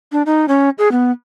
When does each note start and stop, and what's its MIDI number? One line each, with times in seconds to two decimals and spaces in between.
0.12 0.22 62
0.26 0.46 63
0.48 0.69 61
0.78 0.91 68
0.92 1.11 59